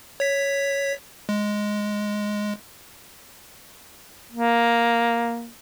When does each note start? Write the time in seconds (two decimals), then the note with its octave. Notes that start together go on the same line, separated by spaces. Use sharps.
0.20 C#5 B6
1.29 G#3
4.32 A#3